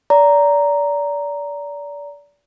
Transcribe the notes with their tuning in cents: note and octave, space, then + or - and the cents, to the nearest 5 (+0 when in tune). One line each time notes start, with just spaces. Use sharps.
D5 -25 A#5 +0